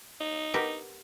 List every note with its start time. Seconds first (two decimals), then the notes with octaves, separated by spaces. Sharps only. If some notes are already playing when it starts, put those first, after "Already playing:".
0.20 D#4
0.54 B3 G4 A#4